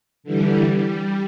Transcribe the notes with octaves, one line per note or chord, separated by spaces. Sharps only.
D3 E3 G3
G3